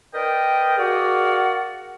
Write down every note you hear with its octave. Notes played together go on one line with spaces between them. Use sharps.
A#4 B4 D5 D#5 G5
F#4 G#4 A#4 D5 F5 F#5